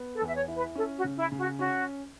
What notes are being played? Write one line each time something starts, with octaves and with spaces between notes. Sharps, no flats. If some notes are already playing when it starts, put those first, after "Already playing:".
Already playing: B3
A4
E2
E5
C#5
E4
B4
C#4 A4
F#4
C#3
E4
C#3
F#4
C#4 F#4